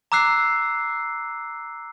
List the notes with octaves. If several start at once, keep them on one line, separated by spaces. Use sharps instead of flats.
A#5 D6 E6 F#6 C7